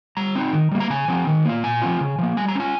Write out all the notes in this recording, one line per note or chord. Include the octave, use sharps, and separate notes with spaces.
G3 A#5
C4 D#4
D#3
G3 A#3
A#5
C#3 G#5
F3 C4
D#3
A#3 F4
A#2 G#5
F3 C4 F4
C#3
F3 A#3
G3 G#5
A#5
C#4 F4 G#5